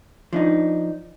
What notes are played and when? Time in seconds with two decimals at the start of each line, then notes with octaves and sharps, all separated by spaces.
0.33 F3 D4 D#4